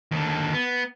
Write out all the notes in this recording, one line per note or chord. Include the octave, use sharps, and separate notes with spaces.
D#2 D3
B3